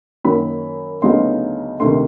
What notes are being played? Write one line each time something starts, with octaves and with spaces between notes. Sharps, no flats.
F#2 D#3 F#3 A#3 B5
D2 C#3 F#3 B3 D#4 C6
D2 C3 D#3 C6